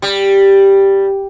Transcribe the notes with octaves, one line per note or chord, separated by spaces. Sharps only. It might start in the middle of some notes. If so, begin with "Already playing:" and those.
G3